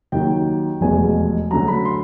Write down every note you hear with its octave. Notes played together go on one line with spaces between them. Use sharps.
D#2 D#3 F#3 G5
F1 E2 B2 G#3 G#5
D2 D3 F#3 A#5
B5
C6